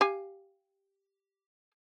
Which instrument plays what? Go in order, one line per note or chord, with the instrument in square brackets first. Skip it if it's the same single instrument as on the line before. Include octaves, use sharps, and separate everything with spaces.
[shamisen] G4 F5 G#5